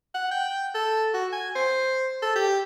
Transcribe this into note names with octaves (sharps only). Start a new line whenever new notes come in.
F#5
G5
A4
F#4
G#5
C5
A4
G4